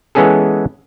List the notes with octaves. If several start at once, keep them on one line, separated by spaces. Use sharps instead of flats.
E3 G#3 B3 C#4 G#4 A4